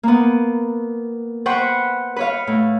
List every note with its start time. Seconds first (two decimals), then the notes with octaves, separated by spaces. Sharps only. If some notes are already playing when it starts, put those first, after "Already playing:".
0.03 A#3 B3
1.46 B4 C5 F#5 G5 B5 C#6
2.16 B4 C#5 F5
2.47 A2